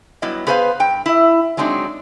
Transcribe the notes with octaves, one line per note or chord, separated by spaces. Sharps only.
F#3 G3 B3 E4 D#5
B3 G#4 B4 C5 D#5 F5
G2 G5
E4 E5
F#3 G#3 C4 D4 D#4